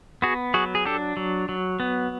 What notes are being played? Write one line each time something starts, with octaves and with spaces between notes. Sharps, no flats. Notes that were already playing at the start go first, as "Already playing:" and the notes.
B3 F#4 G#4
F#3 F#4 G#4
G#4
D4 G4 A4
F#3
F#3
B3